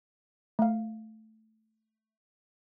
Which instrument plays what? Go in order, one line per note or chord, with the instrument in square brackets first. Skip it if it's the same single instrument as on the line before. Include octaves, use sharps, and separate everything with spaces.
[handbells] A3 F5